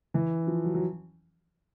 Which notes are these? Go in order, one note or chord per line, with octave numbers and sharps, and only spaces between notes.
E3
F3
F#3
F#3